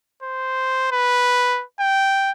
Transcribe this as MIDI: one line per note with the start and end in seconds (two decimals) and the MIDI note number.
0.23 0.87 72
0.92 1.63 71
1.80 2.31 79